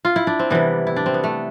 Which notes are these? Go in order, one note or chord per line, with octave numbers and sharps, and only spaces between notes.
F4
E4
D4
C4
C3 E3 G3 B3
E4
D4
C4
B3
A3